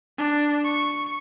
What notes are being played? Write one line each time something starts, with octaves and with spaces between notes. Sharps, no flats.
D4
C#6